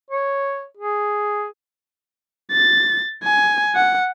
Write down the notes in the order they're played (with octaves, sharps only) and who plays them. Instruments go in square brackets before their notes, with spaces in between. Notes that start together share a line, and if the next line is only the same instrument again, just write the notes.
[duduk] C#5
G#4
[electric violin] A6
G#5
F#5